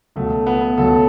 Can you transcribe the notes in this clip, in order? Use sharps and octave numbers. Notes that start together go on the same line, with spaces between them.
C#2 B2 F#3 A3
B3
C#2 B2 F#3 A4